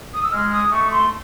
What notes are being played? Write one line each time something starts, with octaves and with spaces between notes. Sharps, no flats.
D#6
E6
G#3 F6
D#6
A3 C#6
C6